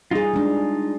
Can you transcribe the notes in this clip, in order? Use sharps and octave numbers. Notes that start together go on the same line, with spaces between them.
G3 D#4 F4 G#4
G#3 D4